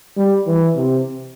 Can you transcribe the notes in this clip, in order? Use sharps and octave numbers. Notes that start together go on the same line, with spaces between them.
G3
E3
C3